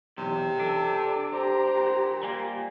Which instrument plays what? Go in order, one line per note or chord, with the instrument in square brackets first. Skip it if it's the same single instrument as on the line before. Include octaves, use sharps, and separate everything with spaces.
[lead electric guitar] B1 E2 [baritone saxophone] C3
[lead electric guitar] D4 [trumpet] A4
[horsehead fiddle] G4 A#5 [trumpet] C5
[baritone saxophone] A#2
[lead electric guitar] G3 A#3 [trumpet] G#5